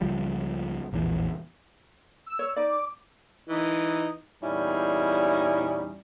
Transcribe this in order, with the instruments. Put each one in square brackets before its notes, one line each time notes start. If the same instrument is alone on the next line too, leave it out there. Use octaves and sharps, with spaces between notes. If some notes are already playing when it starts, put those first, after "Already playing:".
[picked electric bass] C#2 F3 G3
A#1 E2 A2 E3
[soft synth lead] E6
[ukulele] C#5
[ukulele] D#4 D5 [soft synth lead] D6
[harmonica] E3 D#4
[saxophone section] E2 A#2 G3 C#4 D#4 E4